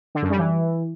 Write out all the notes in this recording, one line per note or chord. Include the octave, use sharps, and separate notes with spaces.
D3
F#2
G3
E3